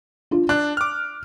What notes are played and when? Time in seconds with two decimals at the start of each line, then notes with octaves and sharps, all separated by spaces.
0.31 D4 F4
0.49 D4 F#6
0.77 D6 F6